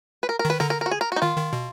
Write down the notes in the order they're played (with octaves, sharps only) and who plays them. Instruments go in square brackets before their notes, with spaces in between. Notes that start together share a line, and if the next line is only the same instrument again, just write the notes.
[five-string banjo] B4
A#4
A#4
[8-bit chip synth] D#3
[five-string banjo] B4
[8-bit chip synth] D3 [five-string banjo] A#4
[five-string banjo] A#4
A#4
F#4
G#4
A#4
F#4
D#4
[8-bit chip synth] D#3 [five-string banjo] F4
[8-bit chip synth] D#3
B2